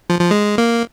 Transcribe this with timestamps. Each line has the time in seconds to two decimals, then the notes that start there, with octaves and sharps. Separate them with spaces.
0.10 F3
0.20 F3
0.31 G#3
0.58 A#3